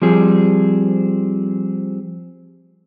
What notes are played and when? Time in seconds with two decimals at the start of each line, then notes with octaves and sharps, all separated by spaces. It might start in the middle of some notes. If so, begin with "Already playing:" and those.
0.02 F3 G3 C4 G#4